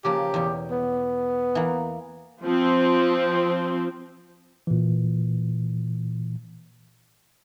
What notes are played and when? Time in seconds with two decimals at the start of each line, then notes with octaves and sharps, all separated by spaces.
0.05 C#3 F3 A#3 G4
0.34 E2 B2
0.71 B3
1.55 E3 A#3
2.43 F3 C4
4.67 A#2 E3